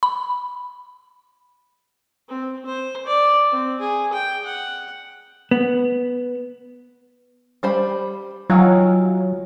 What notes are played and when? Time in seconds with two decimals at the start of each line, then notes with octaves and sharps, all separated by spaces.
0.03 B5
2.29 C4
2.66 C5
3.07 D5
3.52 C4
3.80 G#4
4.13 G5
4.46 F#5
5.51 B3
7.63 G3 C5 B5
8.50 D#3 E3 F#3 F4